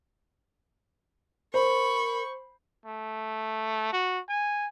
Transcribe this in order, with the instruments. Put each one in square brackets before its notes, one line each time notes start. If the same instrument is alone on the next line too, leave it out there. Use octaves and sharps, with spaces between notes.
[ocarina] A#4 [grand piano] C5 [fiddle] B5 [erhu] C#6
[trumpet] A3
F#4
G#5